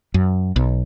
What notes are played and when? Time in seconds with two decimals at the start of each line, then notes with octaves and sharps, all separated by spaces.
0.14 F#2
0.56 B1